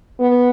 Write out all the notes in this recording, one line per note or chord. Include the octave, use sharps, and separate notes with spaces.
B3